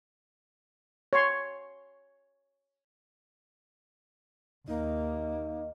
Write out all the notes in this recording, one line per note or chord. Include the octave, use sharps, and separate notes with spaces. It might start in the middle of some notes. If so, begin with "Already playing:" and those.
C#5 C6
D#2 A#3 D#4 D#5